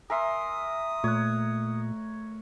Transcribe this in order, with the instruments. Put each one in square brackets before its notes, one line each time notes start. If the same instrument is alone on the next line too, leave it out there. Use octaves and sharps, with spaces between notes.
[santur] A#4 E5 C6 [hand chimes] G#5 [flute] D#6
[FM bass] A#2 [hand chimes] A3 F#6 [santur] C#5